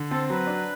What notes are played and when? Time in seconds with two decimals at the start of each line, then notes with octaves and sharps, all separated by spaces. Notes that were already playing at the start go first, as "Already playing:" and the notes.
Already playing: D3
0.11 C4 A4
0.30 F#3 B4
0.47 D4